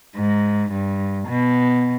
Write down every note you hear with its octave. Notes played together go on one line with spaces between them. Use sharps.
G#2
G2
B2